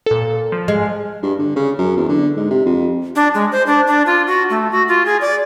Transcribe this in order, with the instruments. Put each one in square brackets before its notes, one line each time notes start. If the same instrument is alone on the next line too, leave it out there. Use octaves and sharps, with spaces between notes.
[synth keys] A#2 A4
F3
[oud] G#3 [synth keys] F6
[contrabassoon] G2
D3
C#3
F#2
E2
D3
G#2
C3
F2
[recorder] D4
G#3
C5
D4
D4
F4
F#4
A3
F#4
F4
G#4
D5